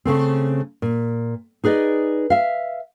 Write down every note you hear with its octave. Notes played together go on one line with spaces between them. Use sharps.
C#3 A3 C4
A#2
D#4 G#4 B4 D5 D#5
E5 F5